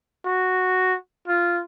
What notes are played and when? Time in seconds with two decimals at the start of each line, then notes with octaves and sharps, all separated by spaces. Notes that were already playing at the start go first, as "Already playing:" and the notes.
0.25 F#4
1.28 F4